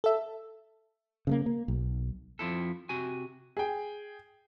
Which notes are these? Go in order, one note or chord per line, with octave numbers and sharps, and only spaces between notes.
A4 E5
C#3 A3 A#3
A#3
B1
F2 F3 E4 A4
C3 F#4 G#5
G#4 G5